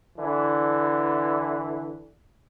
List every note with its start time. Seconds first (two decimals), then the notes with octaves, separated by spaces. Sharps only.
0.19 D3 E3